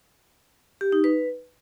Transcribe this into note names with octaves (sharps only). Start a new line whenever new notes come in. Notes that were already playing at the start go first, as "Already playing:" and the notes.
G4
D#4
B4